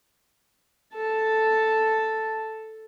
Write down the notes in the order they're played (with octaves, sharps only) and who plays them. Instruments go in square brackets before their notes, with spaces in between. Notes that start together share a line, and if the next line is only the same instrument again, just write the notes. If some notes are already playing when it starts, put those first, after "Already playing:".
[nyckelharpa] A4 A5